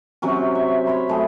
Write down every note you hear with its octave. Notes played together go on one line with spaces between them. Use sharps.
C3 F#3 C#4
E5
C#5 E5 B5 C6
F#2 A3 G#4